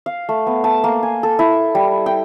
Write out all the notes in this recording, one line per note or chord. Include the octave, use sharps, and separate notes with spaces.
F5
A3
B3
A5
A#3
G#5
A4
E4
G3
G5